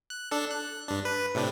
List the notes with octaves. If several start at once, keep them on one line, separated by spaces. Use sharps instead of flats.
F#6
D4 A4
F#6
G2 D4
B4
A2 C3 D4